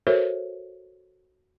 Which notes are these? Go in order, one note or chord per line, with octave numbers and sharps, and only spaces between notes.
F#4 A4 A#4 C5 C#5 E5